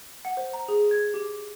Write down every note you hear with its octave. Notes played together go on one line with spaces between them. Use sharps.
F#5
C5
A#5
G#4
G#6
G4